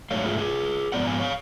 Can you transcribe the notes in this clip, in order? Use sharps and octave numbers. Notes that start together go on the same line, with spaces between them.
G#2 F#3 A3 C#5 F5
F4 G#4
F4 G#4
G#2 F3 G#3 B3 D5 F#5
F5 G#5
C#5 F5